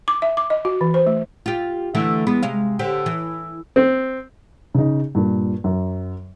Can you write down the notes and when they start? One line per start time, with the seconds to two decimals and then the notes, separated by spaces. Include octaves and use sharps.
0.08 D6
0.22 E5
0.37 D6
0.50 D#5
0.65 F#4
0.81 E3
0.94 C5
1.07 A3
1.46 F4 G4
1.95 D3 E3 A3
2.27 E3 G#3 B3
2.43 C3 G#3 F5
2.79 D3 G4 C5
3.06 E3
3.76 C4
4.75 C#3 D#4
5.15 G2 A#2
5.64 F#2